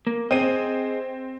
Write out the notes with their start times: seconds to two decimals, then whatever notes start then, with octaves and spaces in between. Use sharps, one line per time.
0.07 A#3
0.31 C4 G#4 C5 D#5 D#7